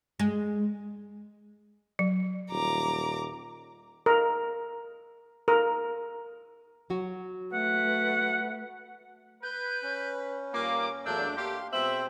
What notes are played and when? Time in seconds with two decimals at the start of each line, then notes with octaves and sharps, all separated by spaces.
0.19 G#3
1.99 F#3
2.51 D#1 A#5 D6
4.06 A#4
5.48 A#4
6.90 F#3 F#4
7.53 A3 B4 F#5
9.42 B4 G6
9.83 C#4
10.54 A#2 G3 A#3 D6
11.05 E2 F#3 A3 A#3 D4 E6 G6
11.37 A3 A#3 G4 F5 C6
11.72 B2 G#3 C4 C5 E5 G5 F#7